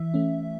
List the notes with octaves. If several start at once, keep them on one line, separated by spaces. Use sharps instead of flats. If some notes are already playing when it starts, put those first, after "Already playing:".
Already playing: E3 E5
A3 C#4